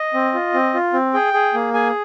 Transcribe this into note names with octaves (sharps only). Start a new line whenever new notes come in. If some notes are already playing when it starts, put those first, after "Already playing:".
Already playing: D#5
C4
F4
C4
F4
C4
G#4 G5
G#4
A#3
G#4 G#5